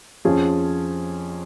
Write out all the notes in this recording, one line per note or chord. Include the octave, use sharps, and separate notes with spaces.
F2 F3 C#4 G#4